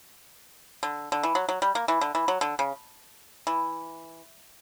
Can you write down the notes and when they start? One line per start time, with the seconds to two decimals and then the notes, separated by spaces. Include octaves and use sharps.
0.83 D3
1.12 D3
1.23 E3
1.35 F#3
1.49 F#3
1.62 G3
1.75 A#3
1.88 E3
2.01 D3
2.15 E3
2.28 F#3
2.41 D3
2.59 C#3
3.47 E3